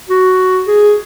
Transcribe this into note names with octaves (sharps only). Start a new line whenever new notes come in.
F#4
G#4